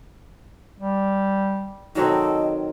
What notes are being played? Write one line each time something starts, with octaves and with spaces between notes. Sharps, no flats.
G3
D#3 F#3 C4 A4 D#5